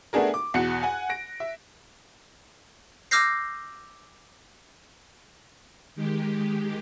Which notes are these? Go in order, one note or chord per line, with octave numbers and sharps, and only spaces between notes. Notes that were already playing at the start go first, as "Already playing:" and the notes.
A3 B3 D4 G#4 A#4
D6
E2 B2 F#4 F#6 C#7
F#5 G#5
A#6 D7
E5
D6 E6 F6 G6 A#6 C7
D#3 G#3 G4